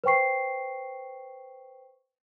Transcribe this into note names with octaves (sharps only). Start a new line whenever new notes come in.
B4 C5 G5 C#6 C7